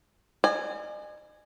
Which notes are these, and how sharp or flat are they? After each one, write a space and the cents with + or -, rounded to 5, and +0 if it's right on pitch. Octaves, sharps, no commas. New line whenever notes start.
D#5 -45 G#5 +0